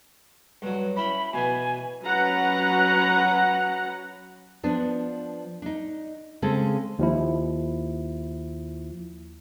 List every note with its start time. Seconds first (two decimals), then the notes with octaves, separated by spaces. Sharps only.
0.62 G2 F#3
0.96 C#4 E4 G5 B5
1.33 B2 E3 G#5
2.04 F#3 C#4 B4 F#5 A#5
4.63 F3 B3 D4
5.62 D4 D#4
6.42 C#3 G#3 C4 A4
6.99 D#2 F3 E4